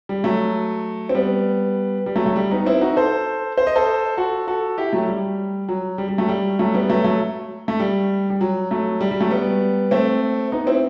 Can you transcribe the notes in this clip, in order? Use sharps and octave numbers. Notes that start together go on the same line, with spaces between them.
G3
F#3 A3
C4
G3 B3
G3
F#3 A3
F#3 A3
G3
B3 D#4
C4 E4
D#4 F#4
A4 C5
C5
D#5
A4 C5
F#4 A4
F#4 A4
E4 G4
F#3 A3
G3
F#3
G3
G3
F#3 A3
G3
F#3 A3
G3 B3
F#3 A3
F#3 A3
A3
G3
G3
F#3
F#3 A3
G3
G3
F#3 A3
G3 B3
A3 C4
B3 D#4
C4 E4